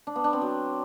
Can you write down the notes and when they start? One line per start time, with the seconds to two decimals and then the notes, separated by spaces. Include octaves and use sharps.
0.07 D4
0.16 B3
0.24 D4
0.33 C4
0.42 F#3